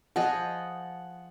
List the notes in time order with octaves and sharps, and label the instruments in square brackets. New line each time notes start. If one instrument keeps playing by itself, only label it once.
[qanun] F3 G#4 D#5 [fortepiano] F#5